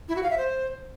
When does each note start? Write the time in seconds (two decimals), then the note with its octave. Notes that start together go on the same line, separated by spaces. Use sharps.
0.09 E4
0.16 F#4
0.23 F5
0.30 E5
0.38 C5